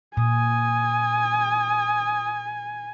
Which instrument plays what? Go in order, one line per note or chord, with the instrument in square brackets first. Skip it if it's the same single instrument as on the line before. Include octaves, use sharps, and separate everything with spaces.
[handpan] A#2 [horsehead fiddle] G#5 [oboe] D#6